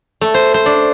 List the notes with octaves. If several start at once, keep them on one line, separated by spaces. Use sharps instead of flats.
A3
C5
C5
D4